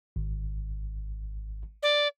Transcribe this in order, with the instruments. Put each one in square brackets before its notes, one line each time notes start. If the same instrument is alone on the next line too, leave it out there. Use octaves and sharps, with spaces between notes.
[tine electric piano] G#1
[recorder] D5